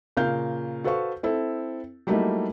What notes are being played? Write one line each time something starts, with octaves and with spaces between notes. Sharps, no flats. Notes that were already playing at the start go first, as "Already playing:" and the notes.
A#2 C#3 A#4 F5 G6
F#4 A4 B4 C5 F5 C#6
C4 E4 A4
F#3 G3 A3 A#3 D#4 E4